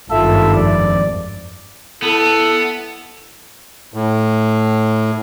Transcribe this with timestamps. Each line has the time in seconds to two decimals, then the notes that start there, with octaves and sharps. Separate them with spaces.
0.10 G#1 G2 F4 A4 E5
0.54 F2 D5
2.02 B3 E4 A4
3.94 A2